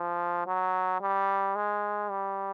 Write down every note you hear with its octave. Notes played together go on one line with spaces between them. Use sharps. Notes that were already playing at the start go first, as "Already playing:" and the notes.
Already playing: F3
F#3
G3
G#3
G3